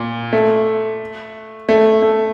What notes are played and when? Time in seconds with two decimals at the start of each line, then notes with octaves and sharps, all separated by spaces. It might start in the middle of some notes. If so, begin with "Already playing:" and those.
Already playing: A#2
0.33 A3
1.69 A3
2.02 A3